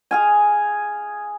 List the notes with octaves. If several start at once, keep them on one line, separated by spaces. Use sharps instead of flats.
G#4 F5 G#5